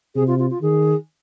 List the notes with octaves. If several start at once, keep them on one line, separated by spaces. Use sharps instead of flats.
C3 G#4
F4
F4
F4
D#3 G#4